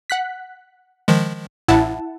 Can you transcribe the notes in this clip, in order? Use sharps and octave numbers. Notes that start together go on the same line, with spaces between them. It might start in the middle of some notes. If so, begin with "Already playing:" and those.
F#5 F#6 B6
D#3 F3 G#3
A1 A2 E4 F#5 A5